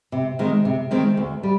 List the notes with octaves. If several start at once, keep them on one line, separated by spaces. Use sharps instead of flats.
C3
D#3 G#3 C4
C3
D#3 G#3 C4
D2
G3